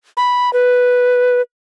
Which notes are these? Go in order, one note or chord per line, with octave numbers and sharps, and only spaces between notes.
B5
B4